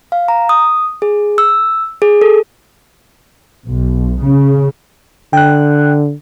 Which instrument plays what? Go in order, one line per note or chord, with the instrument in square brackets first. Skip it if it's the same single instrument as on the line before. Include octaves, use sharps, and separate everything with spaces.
[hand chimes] F5
A#5
D#6
G#4
E6
G#4
A4
[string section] B1
C#3
[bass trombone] D3 [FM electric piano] G5 F#6